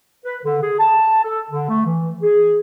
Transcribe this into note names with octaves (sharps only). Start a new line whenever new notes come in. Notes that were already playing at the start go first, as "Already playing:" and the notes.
B4
D3
G#4
A5
A4
D3
A3
E3
G#4